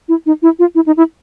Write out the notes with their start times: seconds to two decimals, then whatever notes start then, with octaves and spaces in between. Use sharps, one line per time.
0.08 E4
0.26 D#4
0.42 E4
0.59 F4
0.75 E4
0.86 D#4
0.97 E4